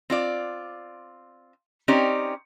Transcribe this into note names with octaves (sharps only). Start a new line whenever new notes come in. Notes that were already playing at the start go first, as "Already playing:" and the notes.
C4 F4 D5
C4 C#4 D#4 G4 D5